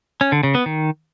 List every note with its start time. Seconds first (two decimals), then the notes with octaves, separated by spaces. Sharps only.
0.21 C#4
0.32 D3
0.43 C#3
0.55 B3
0.66 D#3